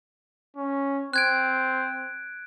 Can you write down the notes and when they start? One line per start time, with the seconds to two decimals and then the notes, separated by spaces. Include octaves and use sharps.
0.57 C#4
1.13 C4 F#6 G#6 D7